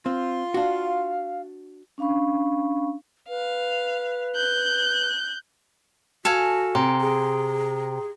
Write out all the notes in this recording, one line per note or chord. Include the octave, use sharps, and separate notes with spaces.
C4 F4
D4 F#4 F5
C#4 D4 F5 B5 C#6
B4 F5
F#6 G6
F#4 A4 F5 G#5
C3 G5 A#5 C6
G#4